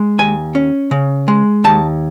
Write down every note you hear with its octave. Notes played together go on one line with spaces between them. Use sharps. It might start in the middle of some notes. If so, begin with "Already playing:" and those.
Already playing: G#3
D#2 G#5
C#4
C#3
G#3
D#2 A5